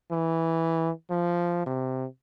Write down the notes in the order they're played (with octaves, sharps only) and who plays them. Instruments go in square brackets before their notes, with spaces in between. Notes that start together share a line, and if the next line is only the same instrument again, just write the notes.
[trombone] E3
F3
C3